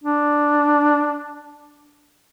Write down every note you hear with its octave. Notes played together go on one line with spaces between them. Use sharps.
D4